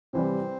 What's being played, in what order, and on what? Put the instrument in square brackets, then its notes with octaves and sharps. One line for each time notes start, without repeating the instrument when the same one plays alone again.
[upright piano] C3 E3 G3 [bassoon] C4